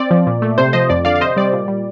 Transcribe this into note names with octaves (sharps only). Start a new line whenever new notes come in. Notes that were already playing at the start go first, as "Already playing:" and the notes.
Already playing: C4 D5
F3
A#2
A3
C3 C5
F3 C5 D#5
F2 D5
D3 D5 F5
F5
C3 C5 D#5
G3 D5
A#2
G3